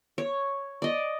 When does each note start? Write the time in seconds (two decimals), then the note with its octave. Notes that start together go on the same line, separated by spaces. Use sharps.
0.18 C#5
0.82 D5 D#5